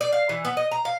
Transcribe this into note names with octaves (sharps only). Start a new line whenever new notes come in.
D5
F5
E3
B3
D#5
A#5
F5